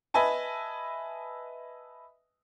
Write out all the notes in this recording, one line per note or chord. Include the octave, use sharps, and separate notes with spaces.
B4 D#5 E5 G#5 A5